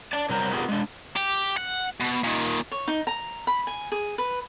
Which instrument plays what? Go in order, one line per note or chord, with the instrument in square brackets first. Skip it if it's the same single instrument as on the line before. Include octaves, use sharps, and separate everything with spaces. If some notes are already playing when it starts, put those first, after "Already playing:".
[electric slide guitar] D5 A5
C3 F#3 G3 A#4 C5 A#5
B3 F4 G4 G#4 A#4
G#3 D4
[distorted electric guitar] G4
F#5
B2
A#2 D#3
[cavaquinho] C#5
D#4
A#5
B5
G#5
G#4
B4